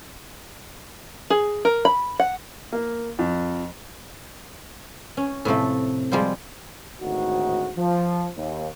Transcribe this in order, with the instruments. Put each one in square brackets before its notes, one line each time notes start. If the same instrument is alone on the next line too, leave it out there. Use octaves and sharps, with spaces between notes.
[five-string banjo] G#4
A#4
B5
F#5
[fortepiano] A#3
F2
[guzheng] C#4
A2 C3 F3 A3
F3 G3 G#3 F4 C5
[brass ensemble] G#1 D2 A2 D#4 F#4
F3
D#2